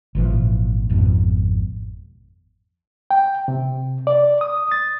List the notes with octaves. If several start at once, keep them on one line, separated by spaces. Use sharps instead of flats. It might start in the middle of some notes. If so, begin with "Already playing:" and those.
G#1 A#2 E3 F3
G#1 F2 G#2 B2
G5
C3
D5
D#6
A6